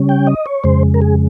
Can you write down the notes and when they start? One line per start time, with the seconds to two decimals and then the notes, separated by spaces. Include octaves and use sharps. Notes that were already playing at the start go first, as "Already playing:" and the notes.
Already playing: C#3 G3 C#4
0.09 G5
0.27 D#5
0.46 C#5
0.64 F2 C#3 G#3 C5
0.94 A#4
1.02 G#4